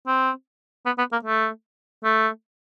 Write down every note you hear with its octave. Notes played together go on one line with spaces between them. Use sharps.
C4
B3
B3
A#3
A3
A3